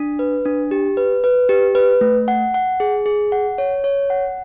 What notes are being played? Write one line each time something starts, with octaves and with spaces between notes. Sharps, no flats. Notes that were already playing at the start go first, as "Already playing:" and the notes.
Already playing: D4
B4
D4
G4
B4
B4
G4
B4
A3
F#5
F#5
G#4
G#4
F#5
C#5
C#5
F#5